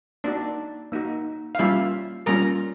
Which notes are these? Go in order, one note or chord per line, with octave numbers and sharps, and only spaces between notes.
A#3 D4 D#4 F#4 D5
A#3 D#4 F#4
F5
G3 A#3 C#4 E4 F4 E5
G3 A#3 C#4 F4 A#4 A#5